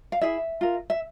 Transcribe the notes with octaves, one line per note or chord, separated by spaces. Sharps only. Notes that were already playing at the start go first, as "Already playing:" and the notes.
F5
E4 G#4 E5
F4 A#4
E5